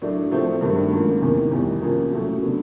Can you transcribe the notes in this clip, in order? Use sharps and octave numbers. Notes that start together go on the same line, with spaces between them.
A2 F#3 A3 D4
A2 F3 A3 C4
G2 D#3 F#3 A3
G#2 F3 A#3 C#4
E2 C3 D#3
E2 B2 G3
F2 C3 F3 A#3 C#4
A2 F#3 A3 C#4 F#4
D3 F#3 B3